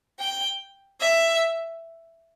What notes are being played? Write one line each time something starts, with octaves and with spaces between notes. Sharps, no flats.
G5
E5